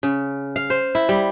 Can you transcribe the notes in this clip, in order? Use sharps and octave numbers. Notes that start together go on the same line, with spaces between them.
C#3
F5
C5
E4
G3